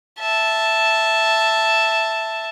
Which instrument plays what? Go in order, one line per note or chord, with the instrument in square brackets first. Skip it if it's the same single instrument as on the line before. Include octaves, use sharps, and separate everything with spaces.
[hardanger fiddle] E5 A5